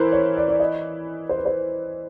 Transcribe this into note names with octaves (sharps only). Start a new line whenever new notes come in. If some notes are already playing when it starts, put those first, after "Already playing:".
Already playing: E3 E4 A#4 C5
C#5
D5
D5
D#5
C5
B4
C5